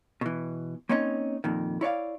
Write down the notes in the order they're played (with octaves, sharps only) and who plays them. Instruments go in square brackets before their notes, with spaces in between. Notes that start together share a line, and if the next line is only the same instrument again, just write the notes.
[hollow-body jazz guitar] B2 E3
A#3 C4 C#4 D#4 C#5 D#5
F2 A#2 D#3
E4 C#5 D5 F5